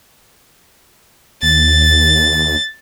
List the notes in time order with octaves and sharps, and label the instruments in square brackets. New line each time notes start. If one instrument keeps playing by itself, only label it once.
[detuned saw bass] D#2 [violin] A6